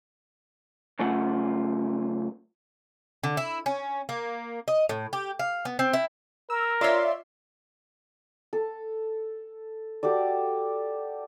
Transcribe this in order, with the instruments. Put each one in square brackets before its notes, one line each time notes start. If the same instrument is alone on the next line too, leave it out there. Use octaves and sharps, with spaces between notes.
[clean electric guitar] F#2 C#3 A3 C#4 F4 F#5
[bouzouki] D3
E4
C#4
A#3
D#5
A2
G4
F5
B3
C4
E4
[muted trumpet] A#4 [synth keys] E6
[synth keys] F4 E5 C6 [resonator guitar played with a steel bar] C#5 D5
[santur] A4
F#4 G4 A4 D5